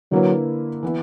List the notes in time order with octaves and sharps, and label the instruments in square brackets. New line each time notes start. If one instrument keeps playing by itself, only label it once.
[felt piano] D3 A#3 E4 B4 [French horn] F#3
[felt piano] E3 B3 E4